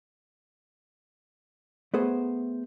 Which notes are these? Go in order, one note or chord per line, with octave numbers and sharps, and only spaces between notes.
A3 B3 G#4 C5